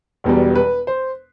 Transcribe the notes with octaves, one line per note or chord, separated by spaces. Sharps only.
E1 E2 B2 G3
B4
C5